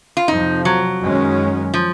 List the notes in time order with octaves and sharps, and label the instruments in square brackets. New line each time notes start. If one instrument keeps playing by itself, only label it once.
[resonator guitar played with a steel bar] F4
[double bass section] F2 C3 F3 [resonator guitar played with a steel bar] D#4
[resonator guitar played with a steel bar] F#3
[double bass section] F#2 D#3 G#3 C#4
[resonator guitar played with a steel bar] F3